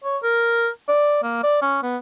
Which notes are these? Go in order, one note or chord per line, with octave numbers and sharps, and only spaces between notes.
C#5
A#4
D5
A#3
D5
C#4
B3